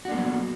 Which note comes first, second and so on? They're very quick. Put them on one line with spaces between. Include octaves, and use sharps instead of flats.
F#4 D4 A#3 B3 F#3